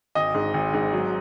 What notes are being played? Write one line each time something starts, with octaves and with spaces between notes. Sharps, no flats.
G#1 D#5
G#2
G#1
G#2
F#3